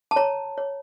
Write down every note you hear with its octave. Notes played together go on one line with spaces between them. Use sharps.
A5
C#5 A#5
C#5